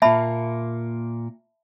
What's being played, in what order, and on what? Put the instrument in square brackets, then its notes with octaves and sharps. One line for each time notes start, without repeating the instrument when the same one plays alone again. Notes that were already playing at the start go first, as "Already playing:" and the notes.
[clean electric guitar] A#2 A#3 [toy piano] E5 A5 B5